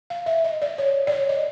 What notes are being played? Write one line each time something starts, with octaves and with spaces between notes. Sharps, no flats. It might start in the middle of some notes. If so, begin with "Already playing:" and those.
F5
E5
D#5
D5
C#5
D5
C#5
D#5